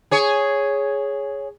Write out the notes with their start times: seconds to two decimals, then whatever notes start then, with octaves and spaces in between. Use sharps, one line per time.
0.11 G#4 C#5